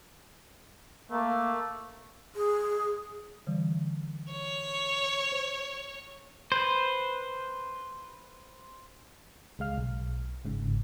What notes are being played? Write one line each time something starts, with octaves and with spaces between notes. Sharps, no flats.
A3 A#3
G#4
D3 E3 G3
C#5
C5
B4 C5
C#2 G#3 F5 F6
B1
G1 G#2 C#3